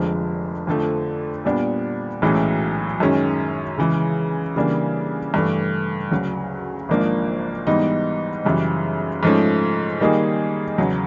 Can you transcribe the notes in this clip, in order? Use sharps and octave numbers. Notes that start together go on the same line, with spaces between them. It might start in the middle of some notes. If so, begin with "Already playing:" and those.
Already playing: F1 F2 D3 F3 G#3
F2 D3 F3 A3
A#2 G3 B3 D4
B1 A2 E3 G#3 C#4
F#2 D#3 G#3 C#4
C#3 E3 G#3
C#3 E3 G3 A#3 D4
G2 E3 A3
D2 C#3 F#3
G#1 G#2 F3 A#3 D4
G#2 E3 G3 B3 D#4
F#2 C#3 E3 G3
G#2 F3 A3 C#4
D#3 G3 A#3 D#4 G#4
E2 C#3 F#3